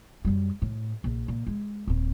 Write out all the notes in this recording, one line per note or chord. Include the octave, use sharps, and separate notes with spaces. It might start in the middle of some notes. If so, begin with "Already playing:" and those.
F#2 G3
A2
A#1
A#2
G#3
D#1 C4